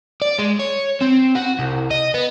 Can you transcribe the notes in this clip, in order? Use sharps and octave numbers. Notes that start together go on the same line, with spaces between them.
D5
G#3
C#5
C4
F#4
C2
D#5
B3